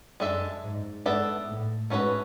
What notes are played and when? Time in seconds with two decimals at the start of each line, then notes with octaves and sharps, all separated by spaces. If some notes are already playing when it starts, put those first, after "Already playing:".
0.20 F#2 G#3 D4 A4 E5
0.63 G#2
1.05 G#2 B3 D4 A4 E5
1.48 A2
1.90 G#2 A3 C#4 F#4 B4